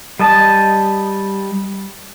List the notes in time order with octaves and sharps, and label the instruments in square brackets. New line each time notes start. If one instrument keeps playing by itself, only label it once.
[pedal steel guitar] G3 D#5 A5